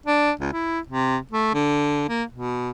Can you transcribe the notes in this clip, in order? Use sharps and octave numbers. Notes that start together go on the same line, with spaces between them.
D4
C#2
E4
C3
A3
D3
A#3
B2